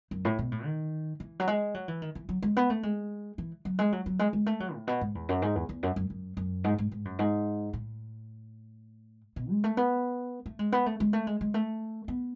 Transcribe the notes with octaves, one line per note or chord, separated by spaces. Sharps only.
F#2
A2
B2
A2
D#3
E3
F#3
G#3
F#3
E3
D#3
E3
F#3
G#3
B3
A3
G#3
E3
F#3
G#3
F#3
F#3
G#3
G#3
A3
F#3
A2
B2
G#2
E2
F#2
G#2
E2
E2
F#2
F#2
F#2
F#2
G#2
G#2
G#2
F#2
G#2
A2
B2
G#3
A3
B3
A3
G#3
B3
A3
G#3
A3
G#3
G#3
A3
B3